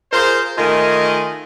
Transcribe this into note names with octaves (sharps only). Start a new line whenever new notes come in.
F4 G#4 A#4 C5
D#3 A3 F4 A#4 D#5 G#5